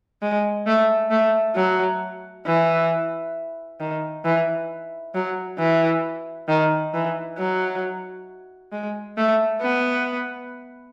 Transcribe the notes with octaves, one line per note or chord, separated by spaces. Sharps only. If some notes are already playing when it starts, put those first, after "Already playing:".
G#3
A3
A3
F#3
E3
D#3
E3
F#3
E3
D#3
E3
F#3
G#3
A3
B3